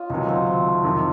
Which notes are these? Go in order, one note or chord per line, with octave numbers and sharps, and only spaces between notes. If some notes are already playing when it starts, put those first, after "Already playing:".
Already playing: F4 C#5 D#5 F5
C#2 C3 D#3 F#3 D#4
C4
C4
A3
F2 C3 D#3